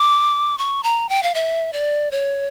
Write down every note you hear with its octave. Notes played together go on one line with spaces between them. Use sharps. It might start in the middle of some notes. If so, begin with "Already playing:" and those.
Already playing: D6
C#6
A#5
G5
F5
E5
D5
C#5